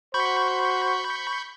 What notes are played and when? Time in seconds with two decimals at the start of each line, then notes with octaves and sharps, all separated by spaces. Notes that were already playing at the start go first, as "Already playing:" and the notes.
0.14 F#4 C5 B5 C#6 G6